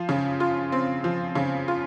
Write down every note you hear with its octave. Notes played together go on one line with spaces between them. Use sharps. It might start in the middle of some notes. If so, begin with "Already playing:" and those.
Already playing: F3
C#3
F4
C4
F3
C#3
F4